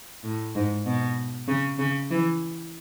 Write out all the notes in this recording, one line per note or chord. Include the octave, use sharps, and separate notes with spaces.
A2
G#2
B2
C#3
C#3
E3